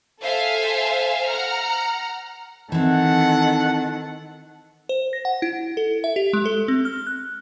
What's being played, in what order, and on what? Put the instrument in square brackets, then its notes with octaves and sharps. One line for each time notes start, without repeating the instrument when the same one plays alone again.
[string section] A4 C5 E5 F5 G#5
F#5 A#5 F6
[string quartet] D#3 A4 [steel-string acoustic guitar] E3 C4 [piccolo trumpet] F#5
[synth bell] C5
A#6
F#5
E4
A4
E5
G4
G#3
A4
C4
F6
F#6